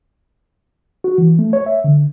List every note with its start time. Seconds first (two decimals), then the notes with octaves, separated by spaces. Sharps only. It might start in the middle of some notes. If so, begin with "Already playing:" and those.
1.04 F#4
1.18 E3
1.39 A3
1.53 C#5
1.66 E5
1.84 D3